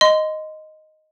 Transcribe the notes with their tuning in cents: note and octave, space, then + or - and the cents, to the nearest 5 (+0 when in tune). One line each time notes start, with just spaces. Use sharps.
D#5 +0 C6 -20